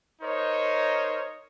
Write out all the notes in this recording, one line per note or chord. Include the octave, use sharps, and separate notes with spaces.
D#4 A#4 C5 C#5 D#5